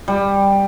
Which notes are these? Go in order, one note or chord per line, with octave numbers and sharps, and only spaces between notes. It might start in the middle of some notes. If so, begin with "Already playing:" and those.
G3